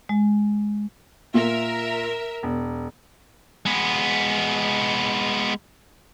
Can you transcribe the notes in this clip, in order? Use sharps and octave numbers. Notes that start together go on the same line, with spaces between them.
G#3
A#2 A#4 E5
E1
G#3 B3